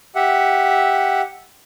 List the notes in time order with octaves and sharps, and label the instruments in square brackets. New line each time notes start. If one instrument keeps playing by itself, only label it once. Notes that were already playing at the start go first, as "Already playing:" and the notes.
[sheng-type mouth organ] G4 E5 F#5